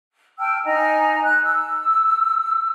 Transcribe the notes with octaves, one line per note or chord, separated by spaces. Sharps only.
G5 A5 E6 F6
D#4 D#5 G#5 A#5
F#6
E6